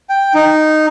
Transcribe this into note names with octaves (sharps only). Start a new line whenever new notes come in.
G5
D#4